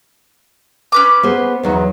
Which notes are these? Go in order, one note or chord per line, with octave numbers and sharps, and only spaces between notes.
C#4 B4 D6
B3 G#4 C5
E2 F#3 D#4